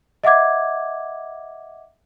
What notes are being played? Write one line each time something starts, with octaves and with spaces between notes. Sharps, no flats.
D#5 E5 F#5 D6 G#6